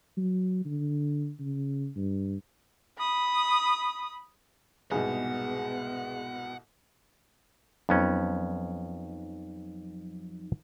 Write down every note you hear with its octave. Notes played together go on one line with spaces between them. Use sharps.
F#3
D3
C#3
G2
B5 D#6
C2 G#2 B2 B3 G#4 F#5
F2 F3 F#3 B3 C#4 D#4